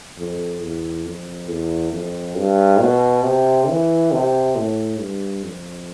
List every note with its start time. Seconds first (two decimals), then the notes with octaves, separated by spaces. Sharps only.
0.18 F2
0.62 E2
1.06 F2
1.49 E2
1.92 F2
2.37 G2
2.80 B2
3.24 C3
3.69 E3
4.12 C3
4.56 A2
4.99 G2
5.44 F2